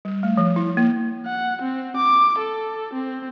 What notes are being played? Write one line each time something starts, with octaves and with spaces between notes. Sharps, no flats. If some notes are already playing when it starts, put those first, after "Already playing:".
G3
A3
F3
E4
A#3
F#5
C4
D6
A4
C4